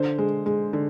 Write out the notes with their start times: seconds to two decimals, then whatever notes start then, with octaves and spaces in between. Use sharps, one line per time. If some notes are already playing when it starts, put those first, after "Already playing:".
Already playing: D3 C5
0.18 G#3
0.46 G#3
0.73 D3